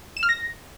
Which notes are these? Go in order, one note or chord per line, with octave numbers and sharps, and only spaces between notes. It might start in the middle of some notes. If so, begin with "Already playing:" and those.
E7
F6
A#6